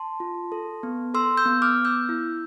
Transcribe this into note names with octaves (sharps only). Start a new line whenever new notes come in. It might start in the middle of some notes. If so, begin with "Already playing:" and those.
Already playing: A5 C6
F4
A4
B3
A4 C6 E6
E6 G6
B3
D6 F6
B3
E6 G6
E4